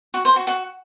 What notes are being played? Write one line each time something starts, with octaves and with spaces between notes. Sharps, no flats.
F#4
C5
F#4
F#4